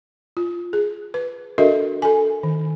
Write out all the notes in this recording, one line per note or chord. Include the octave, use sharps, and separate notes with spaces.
F4
G#4
B4
D4 F#4 A4 A#4 D#5 E5
A4 G#5
D#3